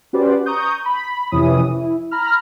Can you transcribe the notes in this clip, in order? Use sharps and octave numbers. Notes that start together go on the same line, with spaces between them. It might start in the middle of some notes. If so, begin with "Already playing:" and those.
C#4 F#4 G4 B4 C5 D5
A#5 C#6 D#6 G6
B5
F2 C3 E3 C#4 D#6
E4
A#5 B5 F6